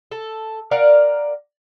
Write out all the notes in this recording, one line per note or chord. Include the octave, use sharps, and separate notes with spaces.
A4
A#4 D5 F5 F#5